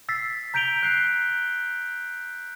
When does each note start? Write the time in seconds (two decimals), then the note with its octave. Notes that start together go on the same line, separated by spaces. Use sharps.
0.09 E6 A6 B6 C7
0.54 A#5 G6 B6 D7 F7 G7
0.83 F#6 C7 G7